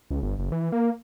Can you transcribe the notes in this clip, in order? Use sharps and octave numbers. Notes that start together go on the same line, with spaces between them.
C#2
G1
F#1
E3
A#3